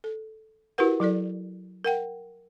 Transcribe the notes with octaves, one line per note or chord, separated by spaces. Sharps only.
A4
E4 F#4 G4 A#4 B4 F#5
F#3 E4 A4 D5
A#4 F#5 G5